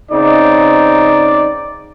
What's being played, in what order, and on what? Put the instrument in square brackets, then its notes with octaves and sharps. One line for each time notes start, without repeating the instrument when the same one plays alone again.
[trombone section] C#3 C4 D#4 [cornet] D5